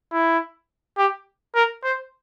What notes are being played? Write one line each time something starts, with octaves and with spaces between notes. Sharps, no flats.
E4
G4
A#4
C5